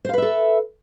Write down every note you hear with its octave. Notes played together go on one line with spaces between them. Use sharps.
A4 B4 C5 E5 F5